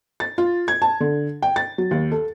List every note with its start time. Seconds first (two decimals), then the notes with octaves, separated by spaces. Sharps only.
0.20 A6
0.38 F4
0.68 G#6
0.82 A5
1.01 D3
1.42 G5
1.56 A6
1.78 F#3
1.91 D#2
2.12 A4